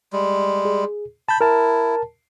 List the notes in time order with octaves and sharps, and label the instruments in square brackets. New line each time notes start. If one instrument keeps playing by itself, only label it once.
[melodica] G3 G#3
[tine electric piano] G#4
[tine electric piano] A5 G6 [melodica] B5
[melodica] E4 [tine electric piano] A#4 A5